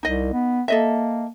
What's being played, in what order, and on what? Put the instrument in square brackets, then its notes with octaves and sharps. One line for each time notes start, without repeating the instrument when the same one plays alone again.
[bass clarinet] C2 [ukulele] D#4 D#5
[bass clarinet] B3
[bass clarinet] A#3 [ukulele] A4 D#5 E5